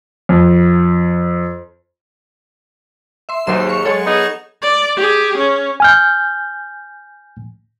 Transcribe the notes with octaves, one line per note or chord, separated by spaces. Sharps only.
F2
E5 C6
D#2 G#2 F#3 C6 E7
F5 C#6
G#3 A4 C#5 F#5
B3 D#4 G#4
D5
G4 G#4
C#4
G#5 F6 G6